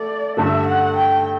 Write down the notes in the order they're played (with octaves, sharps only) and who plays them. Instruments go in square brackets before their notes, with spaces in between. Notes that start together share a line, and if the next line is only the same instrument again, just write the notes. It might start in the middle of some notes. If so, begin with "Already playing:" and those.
Already playing: [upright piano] A3 [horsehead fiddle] D5
[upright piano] G2 D3 A3 [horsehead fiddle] E5
[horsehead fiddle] F#5
G5